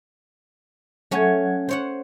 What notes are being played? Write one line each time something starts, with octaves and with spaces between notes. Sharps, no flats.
F#3 A3 C#4 C#5 F#5 G#6
C5 C#5 F#5